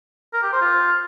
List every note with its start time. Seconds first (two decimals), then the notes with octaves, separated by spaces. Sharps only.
0.34 A#4
0.43 G4
0.52 C5
0.62 F4